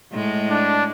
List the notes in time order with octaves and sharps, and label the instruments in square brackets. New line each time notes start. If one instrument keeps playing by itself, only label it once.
[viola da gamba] A2 G#3
[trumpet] D4